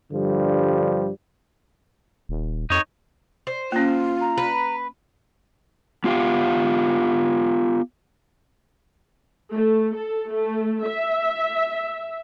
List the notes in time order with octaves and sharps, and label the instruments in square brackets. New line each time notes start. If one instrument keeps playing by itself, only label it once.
[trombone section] G2 D3 F3 G3
[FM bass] D#1
[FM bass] F2 [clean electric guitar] D#4 C#5
[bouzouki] C5
[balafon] A#3 C#4 [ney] F4
[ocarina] A#5
[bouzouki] B4
[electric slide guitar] B3 F4 G4 F5 G5
[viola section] A3
A4
A3
E5